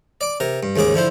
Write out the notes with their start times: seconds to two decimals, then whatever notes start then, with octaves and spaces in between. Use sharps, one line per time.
0.21 D5 D6
0.40 C3 A#4
0.63 G2
0.76 D#2 G#2 C#3 G#4 D6
0.94 D3 F3 E4 C5